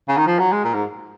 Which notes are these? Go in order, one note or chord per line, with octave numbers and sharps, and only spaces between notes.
C#3
D#3
F3
F#3
G#3
A#2
G#2